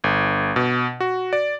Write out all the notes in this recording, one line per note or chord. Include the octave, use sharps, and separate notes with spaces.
G1
B2
F#4
D5